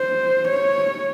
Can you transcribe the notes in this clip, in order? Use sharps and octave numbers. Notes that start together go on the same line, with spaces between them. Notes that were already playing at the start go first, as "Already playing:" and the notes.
Already playing: C5
C#5